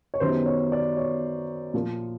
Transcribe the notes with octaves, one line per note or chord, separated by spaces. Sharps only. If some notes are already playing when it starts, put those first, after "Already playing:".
C#5
F#2 D#3 G3 B3 C5
C#5
D5
C#5
A#2 F3 A#3